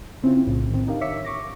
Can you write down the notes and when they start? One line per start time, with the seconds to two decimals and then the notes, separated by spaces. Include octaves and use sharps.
0.22 C#3 C4 C#4 E4 F4
0.47 B1 A2 C#3
0.71 D#3 C4
0.87 D4 D#4 G4 A#4 F5
1.01 C#5 E5 D6 E6 B6 C#7
1.25 C#6 D6 A#6